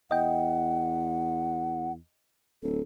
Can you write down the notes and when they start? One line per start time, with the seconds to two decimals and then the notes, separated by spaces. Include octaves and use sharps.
0.11 E2 D#5 F#5 G5
2.63 D1 A4